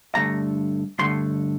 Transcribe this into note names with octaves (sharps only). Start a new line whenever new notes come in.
G2 D3 A3 A#5
G2 D3 A3 C6